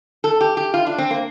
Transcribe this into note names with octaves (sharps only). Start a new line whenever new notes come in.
A4
G4
G4
F4
D4
C4
A#3